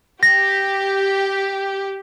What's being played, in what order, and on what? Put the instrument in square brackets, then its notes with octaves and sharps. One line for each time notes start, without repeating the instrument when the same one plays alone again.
[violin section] G4 [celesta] A#6